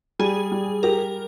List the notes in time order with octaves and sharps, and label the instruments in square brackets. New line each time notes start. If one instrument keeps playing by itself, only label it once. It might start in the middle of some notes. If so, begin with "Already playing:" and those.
[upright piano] G3 [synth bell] G#4
[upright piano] G3
[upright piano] G4 [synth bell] A#4